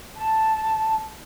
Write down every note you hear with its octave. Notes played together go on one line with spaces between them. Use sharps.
A5